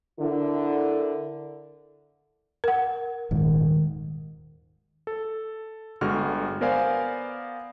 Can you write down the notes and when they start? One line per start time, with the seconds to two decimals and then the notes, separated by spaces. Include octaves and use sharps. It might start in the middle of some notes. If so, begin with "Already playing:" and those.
0.20 D3 E4 A#4
2.64 A#4 F#5
3.31 D#1 G#2 D#3
5.07 A4
6.01 G1 D3 G#3 F#4 F6
6.61 B3 A#4 C5 D5 F5 G#5